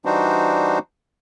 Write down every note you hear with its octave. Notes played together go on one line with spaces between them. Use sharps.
E3 G3 D4 D#4 F#4 C5